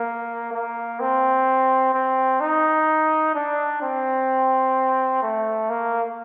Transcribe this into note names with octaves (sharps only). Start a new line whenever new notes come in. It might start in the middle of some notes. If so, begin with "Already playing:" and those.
Already playing: A#3
A#3
C4
C4
D#4
D4
C4
A3
A#3